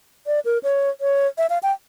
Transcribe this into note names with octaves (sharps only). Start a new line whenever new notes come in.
D5
A#4
C#5
C#5
E5
F5
G5